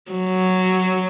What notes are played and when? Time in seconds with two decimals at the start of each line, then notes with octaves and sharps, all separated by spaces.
0.12 F#3